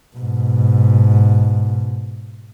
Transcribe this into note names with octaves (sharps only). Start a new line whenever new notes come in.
G#2 B2